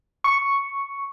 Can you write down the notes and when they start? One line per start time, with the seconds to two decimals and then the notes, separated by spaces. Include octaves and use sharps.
0.24 C#6